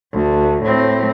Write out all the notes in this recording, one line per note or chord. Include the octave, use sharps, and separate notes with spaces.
D2
A2 C4